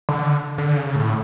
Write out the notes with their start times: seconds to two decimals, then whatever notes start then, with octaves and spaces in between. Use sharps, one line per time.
0.09 D3
0.58 D3
0.77 C#3
0.96 A2